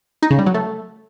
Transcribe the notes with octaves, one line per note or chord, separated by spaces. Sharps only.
D#4
C#3
G3
F#3
A3